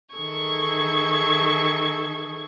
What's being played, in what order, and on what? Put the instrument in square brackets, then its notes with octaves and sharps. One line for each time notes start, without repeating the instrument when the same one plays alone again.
[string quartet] D#3 E3 G#4 A4 C#6 G#6